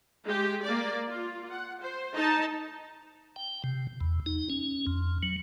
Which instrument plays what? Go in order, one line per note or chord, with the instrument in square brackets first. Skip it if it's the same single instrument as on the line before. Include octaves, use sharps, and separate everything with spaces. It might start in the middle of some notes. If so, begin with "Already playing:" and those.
[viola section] G#3 G4
A#3 D5
F4
F#5
C5
D#4 A5
[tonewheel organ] G5
C3
E2
D#4
C#4
F2
F#3